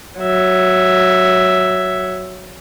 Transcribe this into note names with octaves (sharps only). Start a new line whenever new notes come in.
F#3 E5